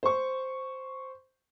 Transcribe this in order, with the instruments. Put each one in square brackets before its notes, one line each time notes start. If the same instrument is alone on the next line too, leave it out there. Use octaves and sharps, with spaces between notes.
[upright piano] C5 C#6